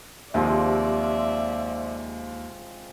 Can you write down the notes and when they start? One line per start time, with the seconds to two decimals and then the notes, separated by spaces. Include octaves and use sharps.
0.34 D#2 C3 F3 G#3 D5 E5